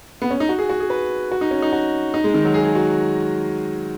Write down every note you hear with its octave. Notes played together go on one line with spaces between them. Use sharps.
B3
C#4
D#4
F#4
G#4
F#4
G#4
B4
F#4
D#4
C#4
D#4
F#4
D#4
G#3
D#3
F#3
G#4
G#4
F#4